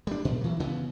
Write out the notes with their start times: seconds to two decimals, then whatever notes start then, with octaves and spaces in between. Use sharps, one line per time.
0.07 G3 D4
0.25 A#2
0.41 E3 F#3
0.60 C#3 E3 B3